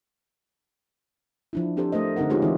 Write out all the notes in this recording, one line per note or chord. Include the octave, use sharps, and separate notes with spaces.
F3 D4 E4
C4 D4 G4 A4 C5
A3 A#4 C5 D#5
D3 C4 D#4 A#4 F#5
G#3 C#4 D#4 F4 G4 G#4
D#3 E3 G#3 C4 D#4 E4